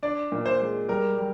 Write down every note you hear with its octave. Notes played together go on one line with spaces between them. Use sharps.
D4 D5
A#2
C5
G#3
G3 A#4
G3